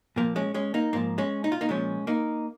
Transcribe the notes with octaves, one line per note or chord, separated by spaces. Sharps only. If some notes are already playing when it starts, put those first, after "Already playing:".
A#2 F3 A#3
G#3 C#4
G#3 C#4
A#3 D#4
G#2 F3 A#3
G#3 C#4
D#4
F4
A#3 D#4
A#2 F3 G#3 C#4
A#3 D#4